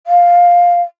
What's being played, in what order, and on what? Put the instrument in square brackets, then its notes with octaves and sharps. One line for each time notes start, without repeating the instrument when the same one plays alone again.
[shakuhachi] F5